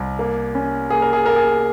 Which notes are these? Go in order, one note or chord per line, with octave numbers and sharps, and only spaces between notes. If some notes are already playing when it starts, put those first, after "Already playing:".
Already playing: C2
A#3
C#4
A#3 G#4
A#4
G#4
A#3 A#4
G#4